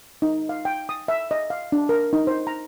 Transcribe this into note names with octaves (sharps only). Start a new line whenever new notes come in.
D#4
F5
G5
D#6
E5
D#5
F5
D4
A#4
D#4
C5
A#5